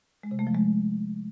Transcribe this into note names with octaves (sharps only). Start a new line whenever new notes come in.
G#3
C3
A3
F3
G#3